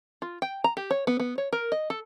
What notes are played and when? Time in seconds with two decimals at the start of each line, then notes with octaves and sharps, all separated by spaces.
0.22 F4
0.42 G5
0.64 A#5
0.77 G4
0.91 C#5
1.07 B3
1.20 B3
1.38 C#5
1.53 A#4
1.72 D#5
1.90 A4